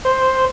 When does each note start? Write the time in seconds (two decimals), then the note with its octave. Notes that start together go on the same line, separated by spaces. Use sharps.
0.05 C5